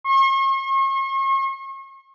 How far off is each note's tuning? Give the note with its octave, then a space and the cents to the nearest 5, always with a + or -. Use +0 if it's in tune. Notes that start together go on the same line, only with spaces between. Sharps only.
C#6 -45